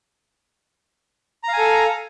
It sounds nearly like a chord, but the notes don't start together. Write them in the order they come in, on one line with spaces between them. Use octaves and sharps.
A#5 F5 G#5 A4